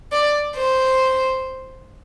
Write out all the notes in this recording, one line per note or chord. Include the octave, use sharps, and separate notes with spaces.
D5
C5